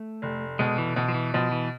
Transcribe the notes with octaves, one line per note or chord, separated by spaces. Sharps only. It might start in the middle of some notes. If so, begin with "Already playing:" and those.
Already playing: A3
F1
B2 G#3
E3
B2 E3
F3
E3
B2 F3
E3